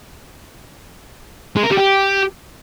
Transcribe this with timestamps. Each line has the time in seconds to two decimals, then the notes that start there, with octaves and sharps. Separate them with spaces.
1.56 G#3
1.63 A#4
1.70 G3
1.77 G4